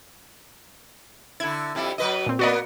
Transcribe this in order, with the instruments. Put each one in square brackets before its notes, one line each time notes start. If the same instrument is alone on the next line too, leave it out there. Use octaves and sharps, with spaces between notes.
[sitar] D3 E4 [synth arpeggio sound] G#6
[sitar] F2 G3 E4
F#3 B4 D#5
[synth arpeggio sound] A#2 C4
[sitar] A#3 B3 [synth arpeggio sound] F#4 D5 D#5